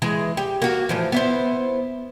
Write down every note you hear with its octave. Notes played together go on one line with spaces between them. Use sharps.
E3 G#3
G4
A#3 F#4
A2 E3 F3
B3 E4 C5